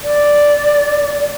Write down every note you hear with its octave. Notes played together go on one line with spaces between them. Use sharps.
D5